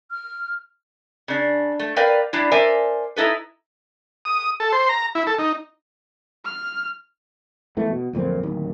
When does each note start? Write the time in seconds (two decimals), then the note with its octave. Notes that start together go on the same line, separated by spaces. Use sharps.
0.11 F6
1.28 C#3 D4
1.79 A3
1.96 A#4 B4 D5 F5 G5
2.33 G3 D4 E4
2.52 A#4 C5 D5 E5 G#5
3.16 D#4 E4 A4 B4
4.25 D#6
4.60 A4
4.72 C5
4.89 A#5
5.15 E4
5.27 A4
5.39 D#4
6.45 F6
7.77 E2 E3 A3
7.90 B2
8.13 D1 F2 A#2 C4
8.43 D1 D#2